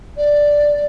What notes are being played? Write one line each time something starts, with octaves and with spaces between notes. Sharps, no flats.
D5